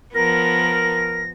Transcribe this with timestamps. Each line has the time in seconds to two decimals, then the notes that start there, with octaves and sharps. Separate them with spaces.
0.15 F3 B3 A#4 A#6